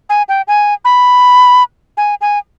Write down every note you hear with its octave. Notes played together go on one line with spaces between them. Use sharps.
G#5
G5
G#5
B5
G#5
G#5